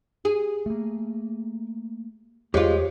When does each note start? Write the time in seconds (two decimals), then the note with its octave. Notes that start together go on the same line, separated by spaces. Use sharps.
0.25 G#4
0.66 A3 A#3
2.54 E2 G#3 F4 G4 C5 C#5